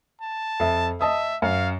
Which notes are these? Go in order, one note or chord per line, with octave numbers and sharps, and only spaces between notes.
A5
F2 E5
D#5 E5 A5 D#6
F#2 F5